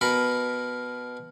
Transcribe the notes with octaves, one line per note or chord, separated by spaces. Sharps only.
B2 A#4 B5